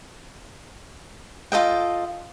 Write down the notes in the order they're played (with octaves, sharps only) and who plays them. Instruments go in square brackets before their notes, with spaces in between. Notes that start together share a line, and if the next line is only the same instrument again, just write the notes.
[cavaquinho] F4 A4 D#5 G5